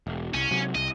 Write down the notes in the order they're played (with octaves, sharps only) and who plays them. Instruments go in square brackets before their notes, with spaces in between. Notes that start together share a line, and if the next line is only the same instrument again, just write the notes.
[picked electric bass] E1
[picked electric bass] C2 [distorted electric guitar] C#4
[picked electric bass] C3 F#3
[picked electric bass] C2 [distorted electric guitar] D#5